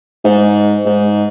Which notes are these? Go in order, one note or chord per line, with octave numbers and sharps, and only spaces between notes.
G#2
G#2